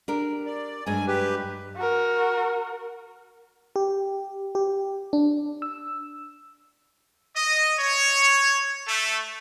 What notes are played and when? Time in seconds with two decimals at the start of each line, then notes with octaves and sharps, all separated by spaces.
0.08 D4 G4 A#4
0.46 D5
0.86 G2 F#3 G#3 G#5
1.07 G4 B4
1.77 F#4 A#4
3.76 G4
4.55 G4
5.13 D4
5.62 E6
7.35 D#5
7.79 C#5
8.88 A3